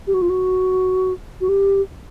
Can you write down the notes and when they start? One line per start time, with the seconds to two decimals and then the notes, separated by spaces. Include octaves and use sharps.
0.07 G4
0.14 F#4
0.22 F4
0.29 F#4
1.41 F#4
1.49 G4